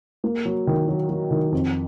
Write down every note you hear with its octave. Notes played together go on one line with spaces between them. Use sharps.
A#3
F#3
D#3
F#3
F#3
D#3
F2